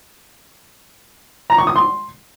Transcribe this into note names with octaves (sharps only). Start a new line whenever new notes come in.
A#5
C#6
D#6
C6